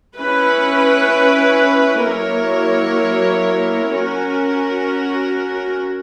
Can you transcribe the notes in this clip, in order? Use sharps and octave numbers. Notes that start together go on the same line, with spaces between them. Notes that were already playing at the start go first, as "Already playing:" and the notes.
C#4 E4 B4
F#3 A#3 E4 A#4 C#5
C#4 F#4 A#4